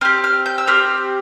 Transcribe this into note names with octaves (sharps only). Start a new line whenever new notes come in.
C4 G4 F6
F6
G6
E6
C4 G4 F6